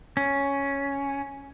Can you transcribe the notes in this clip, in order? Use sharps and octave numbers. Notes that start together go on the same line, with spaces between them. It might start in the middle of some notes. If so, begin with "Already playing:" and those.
C#4